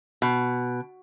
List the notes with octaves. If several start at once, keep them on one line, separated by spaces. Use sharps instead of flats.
B2